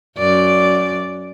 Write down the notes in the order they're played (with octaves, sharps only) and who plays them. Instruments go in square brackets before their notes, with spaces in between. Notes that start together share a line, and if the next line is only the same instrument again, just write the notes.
[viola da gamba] F#2 D5